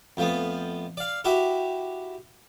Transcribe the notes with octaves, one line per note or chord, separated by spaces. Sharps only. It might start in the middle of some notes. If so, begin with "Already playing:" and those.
F2 F3 A3 B3
D5 F5
E4 F#4 G4 E5